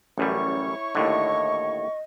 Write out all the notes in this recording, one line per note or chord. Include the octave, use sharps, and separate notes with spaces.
A1 F#2 G3 E4 C#5 C#6
D#2 A2 D3 D#5